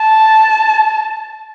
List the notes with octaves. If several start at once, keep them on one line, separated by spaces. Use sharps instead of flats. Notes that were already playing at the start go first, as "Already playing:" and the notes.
Already playing: A5